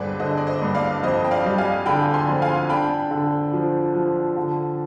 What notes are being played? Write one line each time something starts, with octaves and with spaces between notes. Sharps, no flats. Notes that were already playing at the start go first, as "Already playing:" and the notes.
Already playing: G2 D3 G4 G#4 B4 C5 D5
D3 C5 D#5
D5
C5 D#5
G2
D5 F5
F2 C5 D#5
G5
D5 F5
G3
F5 G#5
D3 G5 B5
G#5 C6
F2
F5 G#5
D4 G5 B5
D3
F3
F3
D3